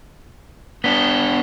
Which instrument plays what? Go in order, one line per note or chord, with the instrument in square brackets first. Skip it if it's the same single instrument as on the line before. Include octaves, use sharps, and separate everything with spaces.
[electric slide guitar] B3 D4 [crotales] B6 G7